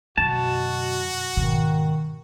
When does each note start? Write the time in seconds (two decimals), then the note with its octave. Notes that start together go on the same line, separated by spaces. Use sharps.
0.18 F#2 B2 D3 F#4 A5
1.37 G#2 B2 D#3